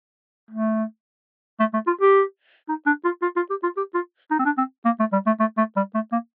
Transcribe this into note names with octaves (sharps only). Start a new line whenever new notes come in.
A3
A3
A3
F4
G4
D#4
D4
F4
F4
F4
G4
F4
G4
F4
D#4
C4
D4
C4
A#3
A3
G3
A3
A3
A3
G3
A3
A#3